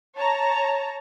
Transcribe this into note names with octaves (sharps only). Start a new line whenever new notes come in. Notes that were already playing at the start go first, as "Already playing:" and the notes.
C#5 A5 A#5